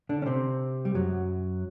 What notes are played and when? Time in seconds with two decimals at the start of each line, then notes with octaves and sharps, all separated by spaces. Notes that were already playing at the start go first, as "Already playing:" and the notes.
0.09 D3 D4
0.22 C#4
0.26 C3 C4
0.85 G3
0.94 F#2 F#3